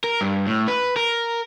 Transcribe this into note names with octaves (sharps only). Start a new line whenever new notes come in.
A#4
G2
A2
B4
A#4